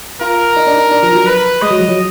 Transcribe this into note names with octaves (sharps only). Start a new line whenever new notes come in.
F4 A#4
D#4
D4
D#4
D4
F3
F#3
B4
G#3 D#5
F#3
F3
F#3